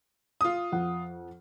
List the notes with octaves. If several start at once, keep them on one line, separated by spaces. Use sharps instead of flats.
F4 D#6
F2 F#5